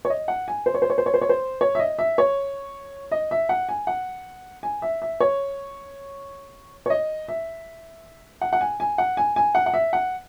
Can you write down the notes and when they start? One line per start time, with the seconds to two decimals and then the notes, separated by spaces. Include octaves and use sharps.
0.05 C#5
0.10 D#5
0.28 F#5
0.48 G#5
0.66 C5
0.74 C#5
0.82 C5
0.90 C#5
0.98 C5
1.06 C#5
1.14 C5
1.21 C#5
1.29 C5
1.61 C#5
1.75 E5
1.79 D#5
1.99 E5
2.18 C#5
3.11 D#5
3.31 E5
3.49 F#5
3.69 G#5
3.87 F#5
4.63 G#5
4.82 E5
5.02 E5
5.20 C#5
6.86 C#5
6.90 D#5
7.28 E5
8.41 F#5
8.53 F#5
8.61 G#5
8.80 G#5
8.98 F#5
9.17 G#5
9.36 G#5
9.55 F#5
9.66 F#5
9.74 E5
9.93 F#5